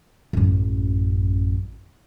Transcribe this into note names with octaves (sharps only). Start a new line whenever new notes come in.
A1 F#2